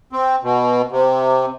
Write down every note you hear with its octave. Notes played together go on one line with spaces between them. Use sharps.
C4
B2
C3